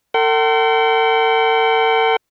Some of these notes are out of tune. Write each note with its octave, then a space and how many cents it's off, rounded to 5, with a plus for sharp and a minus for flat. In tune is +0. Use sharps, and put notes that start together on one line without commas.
A4 +45 G5 -45 C6 +0